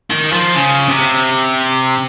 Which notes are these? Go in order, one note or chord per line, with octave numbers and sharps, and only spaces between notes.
D#3
F3
C#3
C3